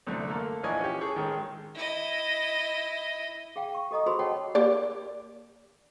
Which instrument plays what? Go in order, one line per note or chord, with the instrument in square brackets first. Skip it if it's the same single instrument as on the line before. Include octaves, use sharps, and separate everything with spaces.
[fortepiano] C2 F#2 D3 A3
A3 A#3 A4 A#4
A#1 E3 D4 C#5 D#5 G#5
C#4 G4
G#4 A4 C#5
A1 D#3 G#3
[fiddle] E4 D#5
[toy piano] G#4 F5 G5
C#6
G4 A4 D#5 A#5 D#6
F#4 G#4 C5 B5 C6 E6
C#5 D#5 F#5 G5 A5
[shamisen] A#3 G4 D5